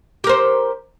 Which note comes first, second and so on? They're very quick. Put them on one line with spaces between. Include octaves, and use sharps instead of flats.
G4 A#4 C5